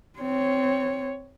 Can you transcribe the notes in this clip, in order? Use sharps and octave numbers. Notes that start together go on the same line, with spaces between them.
C4 C#5